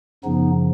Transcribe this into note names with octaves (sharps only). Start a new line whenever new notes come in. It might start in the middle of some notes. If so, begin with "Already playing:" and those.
F#2 C#3 F3 B3 D#4